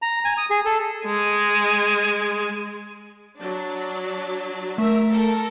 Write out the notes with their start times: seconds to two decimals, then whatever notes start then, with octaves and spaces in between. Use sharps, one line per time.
0.02 A#5
0.25 G#5
0.38 D#6
0.50 G#4
0.65 A4
1.06 G#3 G#5
3.38 F#3 D4
4.78 A3 A#4 E5
5.11 A4 A#4